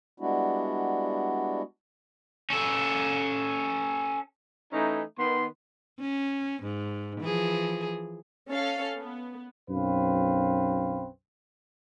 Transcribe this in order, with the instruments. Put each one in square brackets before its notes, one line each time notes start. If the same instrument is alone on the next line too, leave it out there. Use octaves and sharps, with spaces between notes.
[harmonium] G3 G#3 B3 D4 E4 F#4
[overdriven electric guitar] C#4 A4
[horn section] E3 A3 C#4 D#4
D#3 B3 C6
[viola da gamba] C#4
G#2
E3 F3 G#4
[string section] C#4 A4 F5
B3
[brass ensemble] B1 F#2 C4 B4 F5